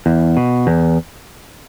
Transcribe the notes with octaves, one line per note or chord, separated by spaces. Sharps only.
E2
B2
E2